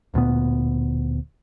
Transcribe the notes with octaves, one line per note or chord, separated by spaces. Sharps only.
D1 D2 A#2 B3